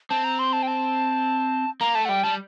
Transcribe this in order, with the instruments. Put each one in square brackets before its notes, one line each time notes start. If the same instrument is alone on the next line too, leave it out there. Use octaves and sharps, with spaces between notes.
[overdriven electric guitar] C4 [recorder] A5
[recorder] A#5
C6
A5
G5
A5
[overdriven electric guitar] A#3 [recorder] A#5
[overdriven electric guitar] A3 [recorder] A5
[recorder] F#5
[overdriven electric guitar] G3 [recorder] G5
[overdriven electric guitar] G3 [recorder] A5